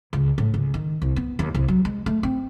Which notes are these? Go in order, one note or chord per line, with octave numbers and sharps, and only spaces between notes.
C#2
A2
C#2
D#3
C2
B3
D#2
C2
F#3
G#3
A3
C4